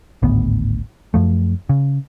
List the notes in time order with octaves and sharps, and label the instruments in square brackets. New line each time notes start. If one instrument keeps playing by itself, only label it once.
[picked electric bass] G#1 D2 A2 B3
F#2 F3 A3
C#3